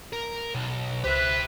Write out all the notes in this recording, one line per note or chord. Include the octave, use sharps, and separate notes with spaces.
A#4
B1
C#2 G4 B4 C5 E5